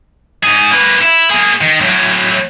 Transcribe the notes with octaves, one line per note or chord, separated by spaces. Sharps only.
G#2 G#4
A#3 B4
E4
A#3 G#4
D#3
A2 F#3